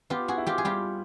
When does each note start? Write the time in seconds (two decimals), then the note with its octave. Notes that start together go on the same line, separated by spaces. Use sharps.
0.10 B3 F4 G4
0.28 F#4 G#4
0.38 E4
0.47 F4 G4
0.58 G#4
0.65 G3 F4 G4